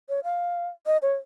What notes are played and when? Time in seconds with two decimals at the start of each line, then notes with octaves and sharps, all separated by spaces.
0.09 C#5
0.24 F5
0.86 D#5
1.02 C#5